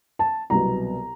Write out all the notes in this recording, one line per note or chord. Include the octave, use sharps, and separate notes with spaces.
A5
C2 B2 F#3 B3 A#5